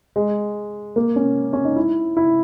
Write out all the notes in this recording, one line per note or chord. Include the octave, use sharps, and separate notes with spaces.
G#3
A#3
C#4
C#4
D#4
E4
E4